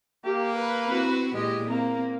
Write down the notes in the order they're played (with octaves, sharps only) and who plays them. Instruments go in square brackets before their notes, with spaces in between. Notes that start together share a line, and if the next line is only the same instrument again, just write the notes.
[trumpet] A#3 [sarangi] G4
[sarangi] B4
[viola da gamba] C4 E4 F#4
[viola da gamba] A#2 E3 G4 [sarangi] G#3 [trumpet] D#5
[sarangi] A#3 [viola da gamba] C4 [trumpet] A#5